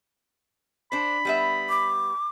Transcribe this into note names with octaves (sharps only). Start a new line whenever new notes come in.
D4 C5 B5
G3 B3 E5
D6